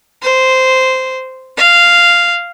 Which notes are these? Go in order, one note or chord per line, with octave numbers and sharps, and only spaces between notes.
C5
F5